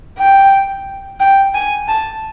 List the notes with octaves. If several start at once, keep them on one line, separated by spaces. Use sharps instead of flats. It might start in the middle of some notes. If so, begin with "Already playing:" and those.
G5
G5
G#5
A5